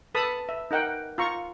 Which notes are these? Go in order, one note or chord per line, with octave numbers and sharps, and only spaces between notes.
A4 B4 A5 B5 D#6
E5
D#4 A#4 F#5 G5
F4 A#5 C#6